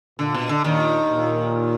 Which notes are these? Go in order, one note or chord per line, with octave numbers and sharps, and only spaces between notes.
A#2 D3
B2
D3
D#2 A#2 D#3
A#2